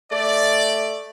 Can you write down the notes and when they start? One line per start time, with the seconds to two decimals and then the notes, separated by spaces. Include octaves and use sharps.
0.11 A3 D5